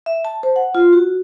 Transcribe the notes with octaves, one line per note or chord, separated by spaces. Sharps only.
E5
A5
C5
F#5
F4
F#4